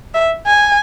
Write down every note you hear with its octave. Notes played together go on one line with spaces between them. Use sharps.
E5
G#5